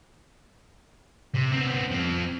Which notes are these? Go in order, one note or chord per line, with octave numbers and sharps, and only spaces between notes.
C3
B3 C4
F3 C4